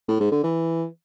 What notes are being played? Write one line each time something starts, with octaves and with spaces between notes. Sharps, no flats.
A2
G#2
D3
E3